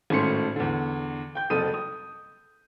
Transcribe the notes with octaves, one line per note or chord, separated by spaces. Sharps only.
G#1 A2 A3 C#4 C6 C#7
E2 D3
G5 G6
F#1 C2 A4 D#6 D#7
D#6